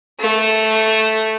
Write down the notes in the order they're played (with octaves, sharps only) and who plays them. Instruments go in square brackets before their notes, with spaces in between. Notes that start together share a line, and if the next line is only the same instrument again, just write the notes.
[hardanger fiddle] A3